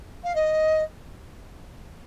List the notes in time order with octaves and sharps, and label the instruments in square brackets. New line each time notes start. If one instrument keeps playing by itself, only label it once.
[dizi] F5
D#5